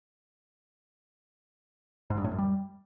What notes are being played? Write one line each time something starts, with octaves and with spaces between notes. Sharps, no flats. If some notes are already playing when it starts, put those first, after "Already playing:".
G#2
G2
A2
F#2
G3